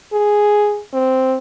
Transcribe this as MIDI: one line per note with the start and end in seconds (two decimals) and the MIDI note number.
0.13 0.81 68
0.93 1.37 60